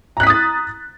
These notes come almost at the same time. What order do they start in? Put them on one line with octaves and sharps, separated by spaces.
A#5 F#6 B6 D#6 A6